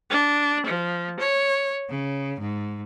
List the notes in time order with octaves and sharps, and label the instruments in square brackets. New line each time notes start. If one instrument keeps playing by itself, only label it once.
[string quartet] D4
F3
C#5
C#3
G#2